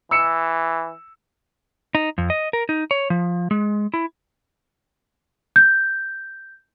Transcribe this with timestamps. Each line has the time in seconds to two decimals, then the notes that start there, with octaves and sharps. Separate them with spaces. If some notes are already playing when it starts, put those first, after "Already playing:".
0.11 E3 E6 C#7 E7
1.95 D#4
2.18 F2
2.30 D#5
2.53 A#4
2.69 D#4
2.91 C#5
3.10 F3
3.51 G#3
3.94 E4
5.56 G6